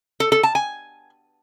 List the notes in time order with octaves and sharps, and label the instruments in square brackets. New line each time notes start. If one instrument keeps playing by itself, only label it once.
[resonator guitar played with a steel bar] A4
A4
A5
G#5